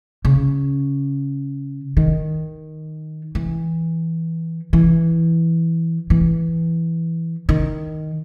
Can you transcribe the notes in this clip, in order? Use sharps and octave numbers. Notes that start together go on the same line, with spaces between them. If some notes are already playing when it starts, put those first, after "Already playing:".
C#3
D#3
E3
E3
E3
D#3